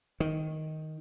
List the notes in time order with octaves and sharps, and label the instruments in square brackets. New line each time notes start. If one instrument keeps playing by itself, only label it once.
[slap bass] D#3